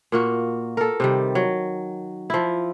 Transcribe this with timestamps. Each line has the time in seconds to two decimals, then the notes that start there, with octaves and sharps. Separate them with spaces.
0.12 A#2 A#3 F#4
0.77 A4 A#4
1.00 C3 D#3 G3
1.35 F#3
2.30 F3 E4